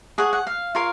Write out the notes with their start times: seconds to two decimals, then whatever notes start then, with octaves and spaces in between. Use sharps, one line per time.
0.18 G#4 C#5 F#5
0.33 F#5
0.47 F5
0.75 F4 A#4 C#5 F5